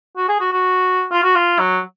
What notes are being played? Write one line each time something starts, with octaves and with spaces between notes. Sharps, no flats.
F#4
G#4
F#4
F#4
F4
F#4
F4
F#3